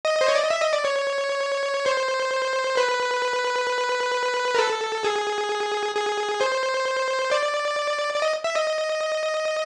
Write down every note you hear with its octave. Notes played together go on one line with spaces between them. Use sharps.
D#5
C5
C#5
D5
D#5
E5
D#5
D5
C#5
C5
B4
A#4
A4
G#4
G#4
C5
D5
D5
D#5
E5
D#5